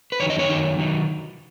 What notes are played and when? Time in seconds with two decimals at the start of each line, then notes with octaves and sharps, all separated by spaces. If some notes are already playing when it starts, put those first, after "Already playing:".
0.12 B4
0.20 F#2 D#3 F#3 D#4 C#5
0.30 D#5
0.39 C#5
0.49 F#2 D#3 F#3 D#4
0.79 D#3 F#3 D#4